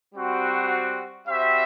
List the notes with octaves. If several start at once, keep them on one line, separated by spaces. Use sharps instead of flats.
G3 C4 F#4
G3 C4 F#4 C5 E5